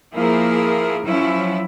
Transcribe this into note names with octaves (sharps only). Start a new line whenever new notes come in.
F3 A#3 E4 G#4 A#4
F3 F#3 C#4 E4